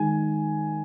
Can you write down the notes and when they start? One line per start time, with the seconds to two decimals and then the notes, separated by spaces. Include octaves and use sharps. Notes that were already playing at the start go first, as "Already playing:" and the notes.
Already playing: D#3 G#3 G#5